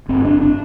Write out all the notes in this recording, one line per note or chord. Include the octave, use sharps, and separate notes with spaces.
G1 C4
D4
D4